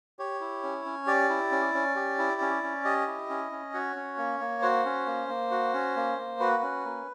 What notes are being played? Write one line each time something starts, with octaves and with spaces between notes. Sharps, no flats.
G4 C#5
E4
C#4
C#4
G4 D5
E4
C#4
C#4
G4
E4
C#4
C#4
G4 D#5
E4
C#4
C#4
F#4 C#5
C#4
A#3
A#3
F#4 C5
C#4
A#3
A#3
F#4
C#4
A#3
A#3
F#4 B4
C#4
A#3